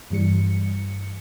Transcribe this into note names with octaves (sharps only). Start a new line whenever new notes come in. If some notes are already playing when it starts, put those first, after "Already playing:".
G2 E3 G3 C#7